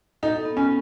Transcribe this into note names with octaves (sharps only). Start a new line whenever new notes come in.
D#4 A4
B3
C#4